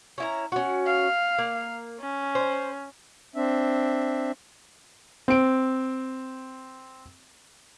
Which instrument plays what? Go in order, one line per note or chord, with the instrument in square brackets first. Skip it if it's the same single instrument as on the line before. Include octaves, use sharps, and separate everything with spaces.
[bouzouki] C#4 E4 A#5
C#4 F#4
[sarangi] F5
[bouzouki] A#3
[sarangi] C#4
[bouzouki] C5
[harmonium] C4 D4 E5
[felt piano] C4 D7